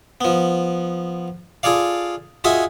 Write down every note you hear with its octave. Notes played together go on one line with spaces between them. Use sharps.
F3 B3
F4 G#4 A4 D5 F5
F4 F#4 G#4 D#5 E5 G#5